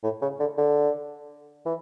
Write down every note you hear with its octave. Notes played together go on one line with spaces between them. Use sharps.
A2
C#3
D3
D3
E3